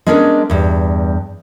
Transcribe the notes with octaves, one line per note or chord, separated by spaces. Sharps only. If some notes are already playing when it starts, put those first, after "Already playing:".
G#3 B3 C#4 D4 F#4 A#4
E2 G2